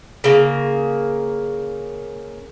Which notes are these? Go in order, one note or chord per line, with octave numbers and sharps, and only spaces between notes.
C#3 A#3